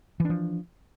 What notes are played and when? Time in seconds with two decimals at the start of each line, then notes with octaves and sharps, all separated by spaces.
0.20 E3
0.25 D4
0.30 F3